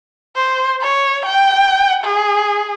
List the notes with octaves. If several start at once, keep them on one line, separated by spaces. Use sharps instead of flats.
C5
C#5
G5
G#4